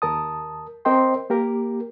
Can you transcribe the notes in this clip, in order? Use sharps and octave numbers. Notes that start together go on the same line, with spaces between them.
D#2 A#4 A5 D#6
C4 A#4 C5 D#5 G5 C6
A#3 G4 A#4